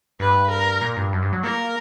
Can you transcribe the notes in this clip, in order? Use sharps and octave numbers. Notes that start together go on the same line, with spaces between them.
G2 B4
A#4
A#2
G2
F#2
G2
F#3
A#3 A#4